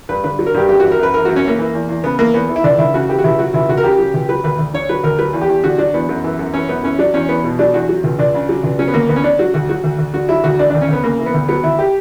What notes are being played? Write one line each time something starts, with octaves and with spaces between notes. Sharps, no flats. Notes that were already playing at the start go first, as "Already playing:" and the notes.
G2 B4
D3 B4
F#3
A#4
G2 G4
F#2 G4
E3 F#4
A#4
F#2 B4
E3 A#4
F#2 F#4
C#4
E3 A#3
E3
E2
E2
C#3 B3
E3 A#3
E2 B3
E3
E4
C#2 D4
C#2 E4
C#3 F#4
E3 G4
F#4
C#2 E4
F#3 F#4
C#2 E4
C#2 F#4
A#4
C#3 G4
F#3
C#2
F#3 B4
D2 B4
D2
D3 C#5
F#3 B4
D2 A#4
F#3 B4
E2
G4
E2
D3 F#4
F#3 D4
E2 B3
F#2
E3
F#2
E3 C#4
F#2 B3
E3 C#4
F#3 D4
E2 C#4
E2 B3
B2
F#3 D4
E2 F#4
F#3
C#2
C#2 D4
C#3
F#3
C#2
F#3 C#4
B3
D2 A#3
D2 B3
C#4
D3 D4
F#3 F#4
D2 F#4
F#3 F#4
D2
D2
D3 F#4
F#3 E4
D2 F#4
E3 D4
D2 D4
C#4
D2 B3
C#3 A#3
E3
B3
D2
F#3 B3
D2 E4
G4